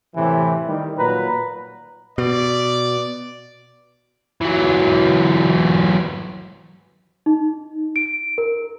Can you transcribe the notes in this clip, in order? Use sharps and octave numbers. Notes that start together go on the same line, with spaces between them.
A2 C3 E3
D#3 G3
A#2 F#3 B4 A#5
B2 D5
E3 F#3
D#4
D7
A#4